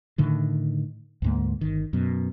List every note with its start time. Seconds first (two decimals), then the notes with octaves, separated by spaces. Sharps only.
0.18 A2 D3 D#3
1.22 D2 G#2 A#3
1.61 G1 D#3
1.93 F#2 B2